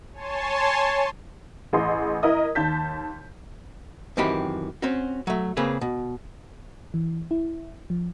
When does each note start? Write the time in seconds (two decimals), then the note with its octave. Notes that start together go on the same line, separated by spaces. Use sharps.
0.13 C#5 G#5 A5 C6
1.73 A1 G#4 D#5 C6
2.23 E4 A#4 D#5 D#6
2.55 D#2 A5 G6 B6
4.17 F#2 D#3 E3 C4 G4 B5
4.82 C4 C#4 F#4
5.27 F#3 A3
5.57 C#3 A#3 C4 G#4 B4
5.81 B2
6.94 E3
7.31 E4
7.90 F3